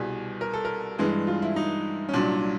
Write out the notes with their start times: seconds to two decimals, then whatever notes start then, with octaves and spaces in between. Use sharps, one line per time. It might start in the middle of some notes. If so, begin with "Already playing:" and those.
Already playing: C2 B2 G3 G#4
0.41 A#4
0.54 A4
0.65 A#4
0.98 G2 E3 G#3 G#4
1.27 F4
1.42 E4
1.56 D#4
2.09 C#4
2.13 C2 A#2 F#3 D4